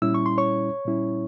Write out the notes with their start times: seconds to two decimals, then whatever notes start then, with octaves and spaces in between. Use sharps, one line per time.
0.02 A#2 G3 C#4 E4 E6
0.14 C#6
0.26 C6
0.38 C#5 C#6
0.85 A#2 G3 C#4 E4